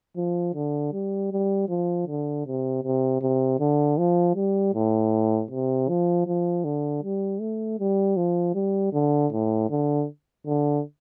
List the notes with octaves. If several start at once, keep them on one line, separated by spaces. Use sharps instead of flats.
F3
D3
G3
G3
F3
D3
C3
C3
C3
D3
F3
G3
A2
C3
F3
F3
D3
G3
A3
G3
F3
G3
D3
A2
D3
D3